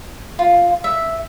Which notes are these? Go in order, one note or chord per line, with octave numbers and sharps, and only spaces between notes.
F4
E5